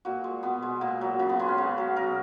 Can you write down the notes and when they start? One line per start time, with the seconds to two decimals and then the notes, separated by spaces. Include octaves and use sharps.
0.05 A#2 F#4
0.24 G#3
0.43 B2 B3
0.62 G#3
0.81 A#2
1.01 F#3
1.19 C#3
1.29 B3
1.39 G#3 B3
1.48 C#4
1.58 C#3
1.78 F#3
1.96 B2 A#4